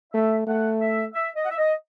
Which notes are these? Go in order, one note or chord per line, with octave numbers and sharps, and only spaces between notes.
A3 E5
A3 F#5
E5
E5
D#5
F#5
E5
D#5